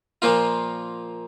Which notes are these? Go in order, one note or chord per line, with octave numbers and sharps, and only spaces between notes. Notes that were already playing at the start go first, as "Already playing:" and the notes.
A#2 F3 A#3 F4